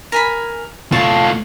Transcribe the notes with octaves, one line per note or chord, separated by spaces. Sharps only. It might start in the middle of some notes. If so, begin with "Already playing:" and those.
A#4 G#5 B5
A3 F4 F5 A5 C#6